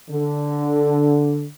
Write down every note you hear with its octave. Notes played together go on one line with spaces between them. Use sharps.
D3